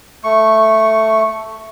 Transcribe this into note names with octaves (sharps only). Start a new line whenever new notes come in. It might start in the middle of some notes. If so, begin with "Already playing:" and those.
A3 C#6